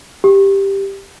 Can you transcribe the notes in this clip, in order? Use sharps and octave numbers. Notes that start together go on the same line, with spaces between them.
G4